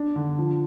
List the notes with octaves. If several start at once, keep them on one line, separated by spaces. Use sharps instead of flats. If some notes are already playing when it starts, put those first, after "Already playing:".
Already playing: D4
D3
F3